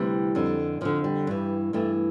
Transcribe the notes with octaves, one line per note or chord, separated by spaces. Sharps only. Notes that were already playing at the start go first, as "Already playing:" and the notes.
Already playing: D2 C3 E3 G3
F2 D3
F2 D3 F3
G3
G2 E3
G2 E3 A3